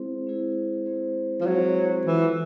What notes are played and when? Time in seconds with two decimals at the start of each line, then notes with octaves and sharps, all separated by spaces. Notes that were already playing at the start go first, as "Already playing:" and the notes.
Already playing: G#3 C4 E4 G#4 C5
0.27 G#3 C4 E4 G#4 C5
0.86 G#3 C4 E4 G#4 C5
1.41 F3
1.47 F#3 G#3 C4 E4 G#4 C5
2.07 E3 F4 A4 C#5